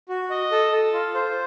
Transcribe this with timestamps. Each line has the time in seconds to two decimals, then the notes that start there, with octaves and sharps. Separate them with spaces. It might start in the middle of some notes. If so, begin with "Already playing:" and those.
0.09 F#4
0.30 D#5
0.51 A4
0.72 A4
0.93 F4
1.14 C5